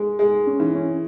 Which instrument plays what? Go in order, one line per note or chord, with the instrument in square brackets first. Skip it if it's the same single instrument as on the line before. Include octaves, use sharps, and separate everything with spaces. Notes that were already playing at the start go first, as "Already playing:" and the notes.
Already playing: [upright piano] G#3
G#3
[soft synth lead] C#4
[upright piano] E3
[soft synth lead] C#4